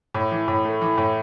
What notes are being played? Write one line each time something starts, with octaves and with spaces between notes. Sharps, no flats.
A2
E3
A2
A3
E3
A2